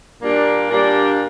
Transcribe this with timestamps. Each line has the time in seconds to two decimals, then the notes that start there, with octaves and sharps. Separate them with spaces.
0.21 A#2 G3 A#3 D4
0.70 A#2 G3 A#3 D4